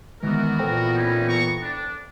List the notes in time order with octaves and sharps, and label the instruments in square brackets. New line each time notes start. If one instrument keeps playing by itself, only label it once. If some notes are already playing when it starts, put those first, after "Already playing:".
[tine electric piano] D#3 G#3 [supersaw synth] E3 B3 [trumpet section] F#4 A#4
[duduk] A#2 [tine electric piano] A4 C5 G5
[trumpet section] C#4 D#4 E4
A#5 C#6
D4